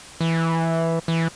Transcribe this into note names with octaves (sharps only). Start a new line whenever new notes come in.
E3
E3